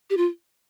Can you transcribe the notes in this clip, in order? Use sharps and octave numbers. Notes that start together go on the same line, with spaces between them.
G4
F4